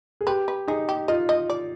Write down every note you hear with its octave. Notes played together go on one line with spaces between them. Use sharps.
G#4
G4 B4
B4
D#4 G#4
G4
F4 D#5
D#5
D5